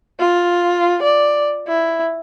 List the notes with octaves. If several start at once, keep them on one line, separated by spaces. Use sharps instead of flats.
F4
D5
E4